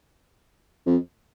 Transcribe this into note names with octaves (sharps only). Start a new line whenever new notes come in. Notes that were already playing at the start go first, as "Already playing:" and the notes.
F2